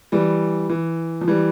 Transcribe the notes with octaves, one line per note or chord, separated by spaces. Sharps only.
E3 G3
E3
F3
E3 G3